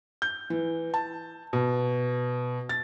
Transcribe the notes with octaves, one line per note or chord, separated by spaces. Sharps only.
G6
E3
A5
B2
A6